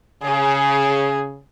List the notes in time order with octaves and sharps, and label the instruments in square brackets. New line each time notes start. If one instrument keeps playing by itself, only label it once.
[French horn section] C#3 [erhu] G#4